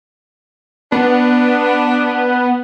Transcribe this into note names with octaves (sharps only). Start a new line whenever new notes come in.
B3 D4